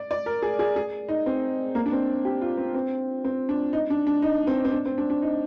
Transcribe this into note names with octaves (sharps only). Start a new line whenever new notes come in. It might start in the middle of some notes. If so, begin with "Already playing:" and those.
Already playing: D5
D5
A#4
G#4
G#4
G#4
D#4
C4
A#3
D4
C4
G4
F4
C4
C4
C4
D4
D#4
D4
D4
D#4
C4
C4
D4
C4
D4
D4
D#4